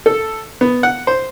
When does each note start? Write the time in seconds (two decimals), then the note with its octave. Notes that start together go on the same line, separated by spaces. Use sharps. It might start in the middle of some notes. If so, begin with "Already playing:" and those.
0.06 A4
0.61 B3
0.83 F#5
1.07 C5